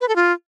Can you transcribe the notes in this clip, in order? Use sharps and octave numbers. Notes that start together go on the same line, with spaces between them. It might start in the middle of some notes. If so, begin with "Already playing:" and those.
B4
A4
F4